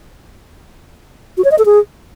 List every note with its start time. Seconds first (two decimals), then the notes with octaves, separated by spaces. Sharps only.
1.37 F#4
1.44 C#5
1.51 D#5
1.58 A4
1.66 G#4